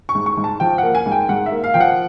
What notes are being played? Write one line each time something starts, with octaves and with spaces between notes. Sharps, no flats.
C#6
G#2
C#6
G#2
A5
F3 G5
F#5
A#3
G#5
G#2
G5
G#2 F#5
E5
A#3
F5
F3 G5
F#5